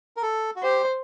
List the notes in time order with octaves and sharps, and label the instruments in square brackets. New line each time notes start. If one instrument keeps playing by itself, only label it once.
[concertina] A#4
A4
F#4
[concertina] G4 [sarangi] C5